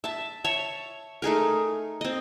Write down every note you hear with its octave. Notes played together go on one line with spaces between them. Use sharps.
E5 A5
C#5 E5 A5
A3 D#4 G#4 A#4
C4 D#5